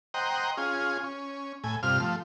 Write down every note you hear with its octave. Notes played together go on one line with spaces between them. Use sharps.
C5 D#5 F#5 G5 A#5
C#4 F4 G#4
C#4
A2 G#5
G2 C3 F4 F6
F3 A3